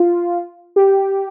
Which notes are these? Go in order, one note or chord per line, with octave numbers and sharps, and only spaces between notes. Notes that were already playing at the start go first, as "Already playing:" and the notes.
Already playing: F4
G4